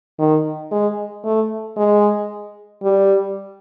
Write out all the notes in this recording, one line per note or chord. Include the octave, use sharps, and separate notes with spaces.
D#3
G#3
A3
G#3
G3